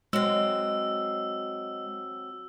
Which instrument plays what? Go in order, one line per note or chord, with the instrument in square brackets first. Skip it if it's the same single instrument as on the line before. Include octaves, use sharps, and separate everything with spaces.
[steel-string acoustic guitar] F#3 C4 [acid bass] G#3 [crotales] E6